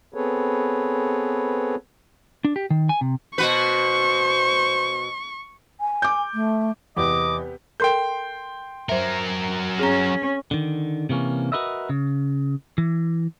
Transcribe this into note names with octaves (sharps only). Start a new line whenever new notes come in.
B3 C4 G#4 A4 B4 C#5
D4
G4
D#3
G#5
C3
B2 F#4 B4 C5 C#6
G#5
D6 G6
A3
E2 C3 B3 G4 D#5 D6
A4 A#4 G5 C6 G6
F#3 A#4 C5 E5
C#4 G#4 A#5
D3 D#3
C3 E3 A#3 C#4
F#4 G4 A#4 B4 D#5 E5
C#3
E3